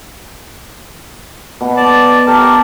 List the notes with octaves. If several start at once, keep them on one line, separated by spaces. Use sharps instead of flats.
B2
D5 A5
G4 A4 A#4 A5